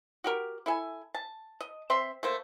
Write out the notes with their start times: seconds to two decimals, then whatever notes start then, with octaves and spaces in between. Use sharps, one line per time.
0.24 F#4 G4 A#4
0.66 E4 A4 G#5
1.14 A5
1.61 D#5
1.90 C4 E5 C6
2.23 A3 A#3 C5